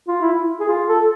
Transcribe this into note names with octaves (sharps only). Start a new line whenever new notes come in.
F4
E4
G#4
F4
A4